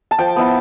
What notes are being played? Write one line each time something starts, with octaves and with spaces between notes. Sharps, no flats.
A5
F3 G5
B3 E4